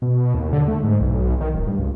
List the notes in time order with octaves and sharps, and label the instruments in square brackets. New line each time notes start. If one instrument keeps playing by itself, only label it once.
[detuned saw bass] B2
D#2
D3
A3
G#2
B1
D#3
D1
G2
C#2